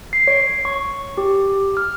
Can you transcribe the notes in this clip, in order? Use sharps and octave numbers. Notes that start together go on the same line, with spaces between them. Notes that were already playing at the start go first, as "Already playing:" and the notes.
C7
C#5
C#6
G4
F6